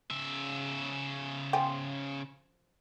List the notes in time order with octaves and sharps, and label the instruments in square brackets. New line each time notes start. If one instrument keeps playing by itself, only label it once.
[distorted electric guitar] C#3 E5
[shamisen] F3 G5 G#5